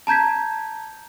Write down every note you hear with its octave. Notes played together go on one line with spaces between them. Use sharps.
A5 A#5 G6 G#6 B6